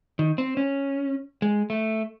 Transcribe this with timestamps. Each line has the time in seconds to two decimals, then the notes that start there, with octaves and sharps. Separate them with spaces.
0.19 D#3
0.38 C4
0.57 C#4
1.42 G#3
1.70 A3